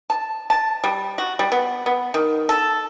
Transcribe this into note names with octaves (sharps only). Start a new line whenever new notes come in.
A5
A5
G3
F#4
G3
B3
B3
D#3
A4